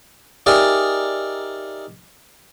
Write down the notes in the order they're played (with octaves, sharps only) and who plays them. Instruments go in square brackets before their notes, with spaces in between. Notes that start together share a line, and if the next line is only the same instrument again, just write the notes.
[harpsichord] D#4 G4 G#4 A#4 D5 E5